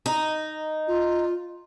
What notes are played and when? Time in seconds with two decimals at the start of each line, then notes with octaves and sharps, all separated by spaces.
0.06 D#4
0.88 F4